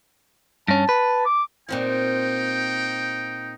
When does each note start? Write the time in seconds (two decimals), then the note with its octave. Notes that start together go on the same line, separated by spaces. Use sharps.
0.68 G2 C#4 A5
0.89 B4
1.26 D6
1.69 A#2 C4 D#4 F4 G5